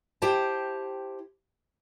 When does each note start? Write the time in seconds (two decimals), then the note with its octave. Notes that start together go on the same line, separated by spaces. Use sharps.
0.22 E4 G4 C5 G5 A5